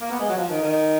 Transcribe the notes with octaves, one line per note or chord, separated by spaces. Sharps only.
A#3
B3
G#3
F#3
F3
D#3
D#3